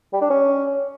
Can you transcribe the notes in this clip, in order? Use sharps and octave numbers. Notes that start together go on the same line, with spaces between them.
G3
D4
C#4